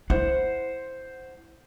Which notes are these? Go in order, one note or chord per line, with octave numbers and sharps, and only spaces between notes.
E4 C5 F#5